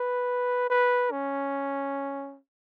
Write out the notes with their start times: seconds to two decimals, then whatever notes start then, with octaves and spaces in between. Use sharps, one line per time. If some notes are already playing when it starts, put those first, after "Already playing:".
Already playing: B4
0.70 B4
1.11 C#4